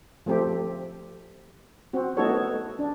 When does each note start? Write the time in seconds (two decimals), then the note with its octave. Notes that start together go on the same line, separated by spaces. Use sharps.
0.26 F3 A3 C4 G4
1.93 C4 F#4
2.17 A3 B3 D#4 F#4 A4 C#5
2.79 D4